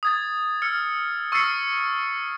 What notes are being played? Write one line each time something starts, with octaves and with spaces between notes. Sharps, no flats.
D#6 G#6 A6
E6 F6 C#7
C#6 E6 F6 A6 C7 C#7